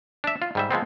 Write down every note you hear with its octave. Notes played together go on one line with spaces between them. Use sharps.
D4 E5
F4
G#2 G3 E5
F3 G#3 B3 C4